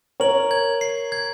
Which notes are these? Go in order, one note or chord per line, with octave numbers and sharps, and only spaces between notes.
A#4 C#5 F#7
G#6
C7
G#6